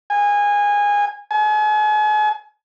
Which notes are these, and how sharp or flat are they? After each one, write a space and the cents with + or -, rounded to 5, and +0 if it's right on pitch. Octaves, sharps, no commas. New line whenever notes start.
G#5 -20
G#5 +40